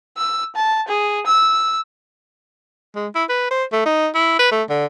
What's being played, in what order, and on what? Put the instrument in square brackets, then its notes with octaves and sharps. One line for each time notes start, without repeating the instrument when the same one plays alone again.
[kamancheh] E6
A5
G#4
E6
[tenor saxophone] G#3
E4
B4
C5
A3
D#4
E4
B4
A3
D3